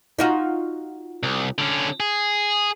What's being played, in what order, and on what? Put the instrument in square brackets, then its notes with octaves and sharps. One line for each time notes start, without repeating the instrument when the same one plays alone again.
[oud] D#4 F4 F#4
[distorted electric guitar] C2
D3 C#4
G#4